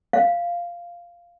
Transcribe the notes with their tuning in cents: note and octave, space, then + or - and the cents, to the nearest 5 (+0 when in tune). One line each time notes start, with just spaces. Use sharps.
F5 -10